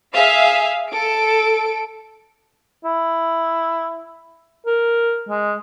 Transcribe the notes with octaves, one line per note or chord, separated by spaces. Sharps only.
G#4 E5 F5
A4 D7
E4
A#4
G#3